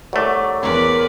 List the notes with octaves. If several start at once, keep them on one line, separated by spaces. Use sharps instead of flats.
C2 F#3 A3 D6
E2 A#4 B4 D5 G#5 C6